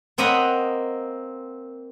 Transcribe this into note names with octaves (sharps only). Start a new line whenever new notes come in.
A#3 C4 A#4 D#5 F#5 B5